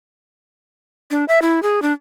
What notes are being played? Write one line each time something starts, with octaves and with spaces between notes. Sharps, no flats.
D4
E5
E4
G#4
D4